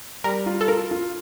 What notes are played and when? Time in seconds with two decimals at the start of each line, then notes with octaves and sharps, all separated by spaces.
0.24 G3 A#4
0.46 F4
0.61 A4
0.68 F4 A#4
0.91 F4